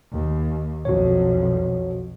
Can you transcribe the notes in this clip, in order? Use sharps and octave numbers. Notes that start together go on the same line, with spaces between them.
D#2
B1 F2 F#4 C#5